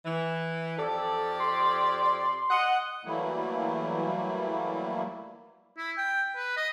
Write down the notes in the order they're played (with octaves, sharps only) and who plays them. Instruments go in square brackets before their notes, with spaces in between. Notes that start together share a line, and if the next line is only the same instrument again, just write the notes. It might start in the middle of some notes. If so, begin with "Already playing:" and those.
[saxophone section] E3
[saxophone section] F2 G4 D5 [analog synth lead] A4
[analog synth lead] C6
[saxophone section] D#5 F#5
[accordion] E3 F#3 G3 A3 A#3 E4
[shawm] E4
G5
B4
D#5